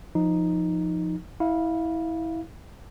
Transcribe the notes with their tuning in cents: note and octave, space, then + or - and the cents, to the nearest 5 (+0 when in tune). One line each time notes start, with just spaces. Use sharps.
F3 +0 D#4 +0
E4 -20 F5 +0